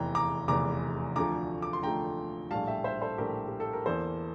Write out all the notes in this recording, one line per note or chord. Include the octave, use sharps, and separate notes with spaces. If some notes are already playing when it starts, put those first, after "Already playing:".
Already playing: F1 E2 E3 G5 A#5
A#5 D6
F1 E2 E3 A#5 D6
D2 D3 F3 A3 A#5 D6
D6
C6
D2 D3 F3 A3 G5 A#5
A#1 A2 G3 F5 A5
E5 G5
C5 E5
A4 C5
A#1 A2 G3 G4 A#4
G4
A4
A#4
E2 E3 A#3 A4 C5